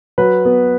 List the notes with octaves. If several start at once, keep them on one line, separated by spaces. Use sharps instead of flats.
F#3 B4
B3